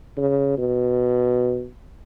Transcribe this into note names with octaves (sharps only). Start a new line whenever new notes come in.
C#3
B2